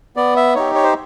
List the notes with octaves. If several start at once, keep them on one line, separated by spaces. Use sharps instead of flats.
B3 D5
E5
D#4 G4 C#5
C#5
C5